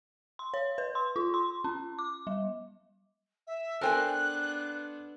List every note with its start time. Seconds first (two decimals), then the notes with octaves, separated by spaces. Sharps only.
0.39 C6
0.54 C#5
0.78 B4
0.95 C6
1.16 F4
1.34 C6
1.64 C#4
1.99 D6
2.27 G3
3.47 E5
3.81 B3 D4 A4 A#4 C5 G5 G#5 F#6